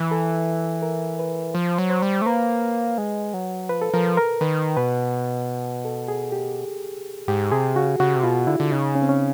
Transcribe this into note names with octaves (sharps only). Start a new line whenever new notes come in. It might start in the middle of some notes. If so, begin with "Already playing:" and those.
Already playing: E3
A4
A#4
B4
F3 C5
F#3
C5
G3
A3
A#3 B4
G#3
F#3
F3 B4
A4
F3 A#4
A#4
D#3 B4
B2 B4
A4
G#4
G4
G#2 G4
C3 G#4
C#3 F#4
C#3 F#4
C3
B2 F4
D3 E4
D3
C#3 D#4
C#4
C4
C#4